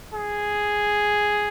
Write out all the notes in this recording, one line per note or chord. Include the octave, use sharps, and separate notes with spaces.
G#4